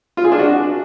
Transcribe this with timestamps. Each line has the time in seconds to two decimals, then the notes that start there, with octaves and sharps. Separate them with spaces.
0.17 F4
0.25 G#4
0.32 D4
0.39 F#4